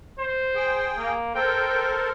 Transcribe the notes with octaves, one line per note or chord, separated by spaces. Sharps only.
C5
G#4 G5
A#3
A4 A#4 C5 G5